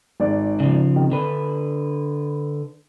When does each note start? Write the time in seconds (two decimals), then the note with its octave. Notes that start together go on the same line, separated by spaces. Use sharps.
0.20 G#1 D5
0.60 C#3 F3
0.96 D#3 C4
1.12 D3 D4 B4